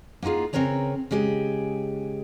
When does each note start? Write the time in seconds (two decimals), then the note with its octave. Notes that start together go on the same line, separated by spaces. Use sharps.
0.22 A#3 B3 D#4 F4 G#4
0.53 C#3 C4 A#4 B4 C#5 A#5
1.11 C#3 G#3 G4 G#4